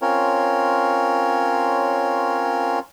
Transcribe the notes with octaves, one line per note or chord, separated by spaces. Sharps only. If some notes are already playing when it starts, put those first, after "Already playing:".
C4 C#4 F4 A#4 C#5